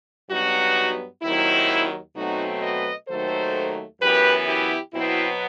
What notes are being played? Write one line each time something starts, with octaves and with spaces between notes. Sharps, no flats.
G2 F#3 B3 D#4 F#4
D#2 D#3 F#3 C4 E4
B2 F#3 A3 C4 D#4 F#4
B4 D#5
D#2 D#3 F#3 A3 A4 C5
F#2 E3 B3 G4 B4
E4 G4
B2 F#3 B3 C4 E4